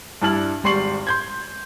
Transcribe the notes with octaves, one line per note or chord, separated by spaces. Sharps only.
G2 D4 E4 A5 F6 F#7
G#1 G3 C6 C#6 C7 F#7
C6 G6 G#6